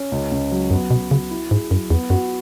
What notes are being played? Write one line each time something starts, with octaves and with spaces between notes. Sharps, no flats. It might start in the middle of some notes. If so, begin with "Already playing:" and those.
Already playing: C#4
C#2
C#2
F#3
F#2 B3
B2 F#3
C#3 F#4
E4
G#2 G#4
F#2 F#3
E2 B3
F#2 F#4